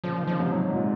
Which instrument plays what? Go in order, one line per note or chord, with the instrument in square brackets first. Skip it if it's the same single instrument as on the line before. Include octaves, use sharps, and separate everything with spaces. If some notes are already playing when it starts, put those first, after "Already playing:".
[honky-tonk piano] A#2 C#3 [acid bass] F3
[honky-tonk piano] D#3
[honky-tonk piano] C#3 [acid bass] F3
[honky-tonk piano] G#2 C3
[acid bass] F#3
[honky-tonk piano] G#2
[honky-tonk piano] A#2 [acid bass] G#3